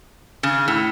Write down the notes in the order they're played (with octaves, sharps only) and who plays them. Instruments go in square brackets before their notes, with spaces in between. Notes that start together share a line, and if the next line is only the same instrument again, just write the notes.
[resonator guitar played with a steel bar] C#3
A2